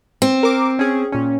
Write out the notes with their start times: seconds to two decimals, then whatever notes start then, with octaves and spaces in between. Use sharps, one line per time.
0.22 C4
0.43 A#4 D6
0.79 C#4 G#4
1.12 A#2 C#4